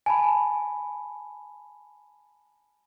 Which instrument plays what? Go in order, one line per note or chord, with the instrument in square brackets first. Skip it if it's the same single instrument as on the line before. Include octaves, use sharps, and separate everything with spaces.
[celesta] G#5 A5 B5